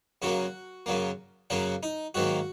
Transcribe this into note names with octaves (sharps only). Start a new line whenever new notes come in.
F#2 C#3 F#3 A#3 F#4
F#2 C#3 F#3 A#3
F#2 C#3 F#3 A#3 F#4
D#4
G#2 D#3 F#3 A#3 F#4